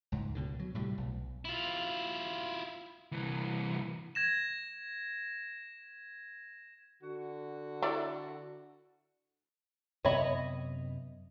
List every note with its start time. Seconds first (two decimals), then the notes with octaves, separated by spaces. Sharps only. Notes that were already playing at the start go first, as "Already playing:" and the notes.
0.12 C#2 G#2
0.35 C#2 B2 D3
0.59 F#3
0.75 A2 C3 G3
0.98 B1
1.45 E4 F4
3.12 C2 E3
4.15 G#6 A#6 E7
7.02 D3 F#4
7.82 E4 A4 D5
10.05 F#2 C3 B3 C#5 D#5 E5 B5